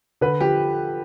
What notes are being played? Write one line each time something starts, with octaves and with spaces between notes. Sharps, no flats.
D3 B4
F3 G4